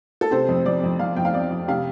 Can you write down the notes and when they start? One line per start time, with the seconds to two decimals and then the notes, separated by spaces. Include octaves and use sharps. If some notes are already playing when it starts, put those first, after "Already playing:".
0.21 A4
0.31 C3 C5
0.48 F2
0.65 F2 D5
0.83 F2
0.99 F2 F5
1.16 F2 G5
1.25 F5
1.33 F2 D5
1.51 F2
1.68 C3 F5